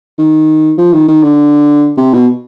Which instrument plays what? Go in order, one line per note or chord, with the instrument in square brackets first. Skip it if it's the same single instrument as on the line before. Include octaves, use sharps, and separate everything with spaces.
[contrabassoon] D#3
F3
D#3
D#3
D3
C3
B2